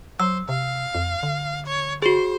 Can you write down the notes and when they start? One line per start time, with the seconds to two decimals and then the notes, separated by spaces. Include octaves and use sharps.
0.20 F#3 C5 E6
0.49 C3 F5
0.95 F2
1.23 D3
1.66 C#5
2.02 F#4 G#4 C5